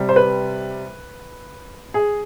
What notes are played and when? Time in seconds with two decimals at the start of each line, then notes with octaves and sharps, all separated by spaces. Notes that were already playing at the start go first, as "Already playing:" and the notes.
Already playing: C3 G3
0.09 C5
0.16 B4
1.94 G#4